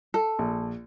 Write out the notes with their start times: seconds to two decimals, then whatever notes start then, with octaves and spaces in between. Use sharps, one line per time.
0.14 A4
0.39 A#1